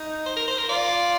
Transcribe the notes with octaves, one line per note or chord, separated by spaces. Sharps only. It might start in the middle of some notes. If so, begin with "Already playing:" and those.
Already playing: D#4
C5
A#4
C5
A#4
F4 D5